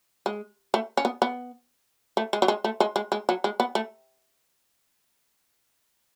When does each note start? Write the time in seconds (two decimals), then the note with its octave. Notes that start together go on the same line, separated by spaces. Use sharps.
0.26 G#3
0.74 A3
0.97 C#4
1.05 B3
1.22 B3
2.17 A3
2.33 G#3
2.42 F#3
2.48 G#3
2.64 A3
2.80 G#3
2.96 G#3
3.12 G#3
3.29 F#3
3.44 G#3
3.60 B3
3.75 A3